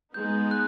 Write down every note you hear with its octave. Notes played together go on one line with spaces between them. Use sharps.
G#3 B3 D#4 G6
F#6